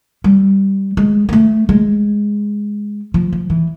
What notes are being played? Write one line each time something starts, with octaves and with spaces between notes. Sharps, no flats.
G3
G#3
A#3
A3
G#3
F3
F3
E3